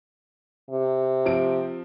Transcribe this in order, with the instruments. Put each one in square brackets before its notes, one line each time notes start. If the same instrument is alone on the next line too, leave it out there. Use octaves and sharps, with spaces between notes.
[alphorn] C3
[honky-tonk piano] F3 C4 D7